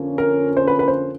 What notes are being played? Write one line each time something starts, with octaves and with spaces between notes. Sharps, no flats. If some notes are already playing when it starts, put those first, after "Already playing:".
Already playing: F2 D3 F3 A#3 C#4
A#4
C5
B4
B4
C5